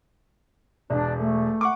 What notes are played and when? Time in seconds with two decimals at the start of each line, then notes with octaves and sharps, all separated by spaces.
0.91 E1 D4
1.20 A3
1.61 F#5 C#6 D6